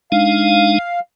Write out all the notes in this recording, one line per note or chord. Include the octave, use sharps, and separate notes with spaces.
G#3 D4 D#4 F5